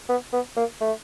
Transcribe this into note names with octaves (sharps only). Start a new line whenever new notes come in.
B3
B3
A#3
A3